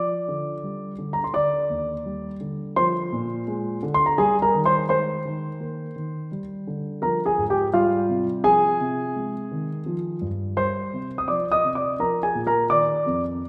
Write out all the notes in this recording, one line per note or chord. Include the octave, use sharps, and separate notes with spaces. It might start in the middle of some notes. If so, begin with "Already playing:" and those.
Already playing: F3 D5 D6
D3
G3
D3
A#5
C6
D3 D5 D6
D#2
G3
D3
F3 C5 C6
A#2
G#3
D3
C6
A#5
G3 G#4 G#5
A#4 A#5
D#3
C5 C6
G#3 C5 C6
D#3
A#3
D#3
G3
D3
F3 A#4 A#5
G#4 G#5
G#2
G4 G5
G3 F4 F5
C3
F3 G#4 G#5
C3
G#3
D#3
F3
G2
G3 C5 C6
C3
D#6
F3 D5 D6
D#5 D#6
C3
D5 D6
F3 A#4 A#5
G#4 G#5
A#2
A#4 A#5
D#3 D5 D6
F2